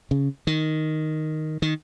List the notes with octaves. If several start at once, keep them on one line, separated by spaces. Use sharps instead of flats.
C#3
D#3
D#3